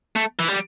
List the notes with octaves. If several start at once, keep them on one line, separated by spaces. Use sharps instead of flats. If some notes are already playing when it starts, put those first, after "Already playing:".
A3
E3
G3